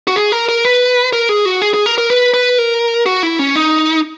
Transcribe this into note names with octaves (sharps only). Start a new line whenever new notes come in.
F#4
G#4
A#4
A#4
B4
A#4
G#4
F#4
G#4
G#4
A#4
A#4
B4
B4
A#4
F#4
E4
C#4
D#4